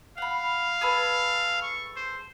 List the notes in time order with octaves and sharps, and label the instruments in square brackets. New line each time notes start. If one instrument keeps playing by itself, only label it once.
[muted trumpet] F5 [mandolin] F#5 B5
[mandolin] G#4 A4 B4
[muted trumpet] C#6
C5